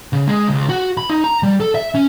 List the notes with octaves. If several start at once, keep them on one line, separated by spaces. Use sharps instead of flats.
C#3
G#3
C#2
F#4
B5
D#4
A#5
G3
A4
E5
C#4